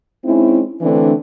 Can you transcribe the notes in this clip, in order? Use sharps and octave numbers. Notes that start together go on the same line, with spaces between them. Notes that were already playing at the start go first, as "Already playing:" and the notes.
G#3 C4 C#4 D#4 E4
D3 E3 A3 C4 D4